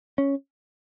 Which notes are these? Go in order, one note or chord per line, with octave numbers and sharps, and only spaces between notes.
C#4